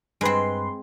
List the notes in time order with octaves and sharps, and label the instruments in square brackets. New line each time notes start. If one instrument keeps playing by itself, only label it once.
[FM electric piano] G2 B4 C6 [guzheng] G#3 C4